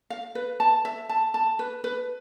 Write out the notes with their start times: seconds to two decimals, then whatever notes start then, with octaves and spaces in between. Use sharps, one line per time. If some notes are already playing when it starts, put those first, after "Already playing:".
0.10 F5
0.35 B4
0.60 A5
0.85 E5
1.09 A5
1.34 A5
1.59 B4
1.84 B4